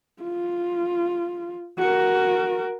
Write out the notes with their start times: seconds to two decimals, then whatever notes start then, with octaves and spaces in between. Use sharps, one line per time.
0.23 F4
1.78 F#4 A#4